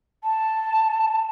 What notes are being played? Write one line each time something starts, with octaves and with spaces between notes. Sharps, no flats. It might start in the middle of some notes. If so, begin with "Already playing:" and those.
A5